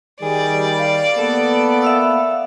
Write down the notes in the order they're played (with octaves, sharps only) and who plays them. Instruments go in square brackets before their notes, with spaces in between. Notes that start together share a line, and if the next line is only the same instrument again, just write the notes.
[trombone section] D#3 G3 [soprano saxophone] G#4 [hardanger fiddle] D5
[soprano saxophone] F5
[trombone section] A#3 B3 [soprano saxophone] A4
[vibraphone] E5 F5 E6